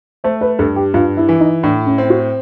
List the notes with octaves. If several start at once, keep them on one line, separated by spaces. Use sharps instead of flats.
A3 C5
B4
G2 A4
G4
G2 F4
E4
E3
D#4
A2 D4
C#4
C4
F#4